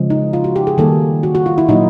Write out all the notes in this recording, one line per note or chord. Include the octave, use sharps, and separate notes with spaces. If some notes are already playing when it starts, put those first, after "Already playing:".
Already playing: C#3 F3 G#3
D#4
F4
F#4
G4
G#4
D#3 G3 A#3 A4
F#4
F#4
F4
E4
A#2 F#3 A#3 D#4